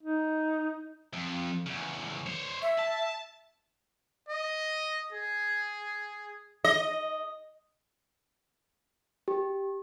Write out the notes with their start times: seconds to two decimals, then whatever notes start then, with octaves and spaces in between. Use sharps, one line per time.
0.03 D#4
1.13 F2
1.66 E2 C#3
2.26 C5 C#5
2.62 E5
2.78 A5
4.29 D#5
5.13 G#4
6.65 D#5
9.28 G4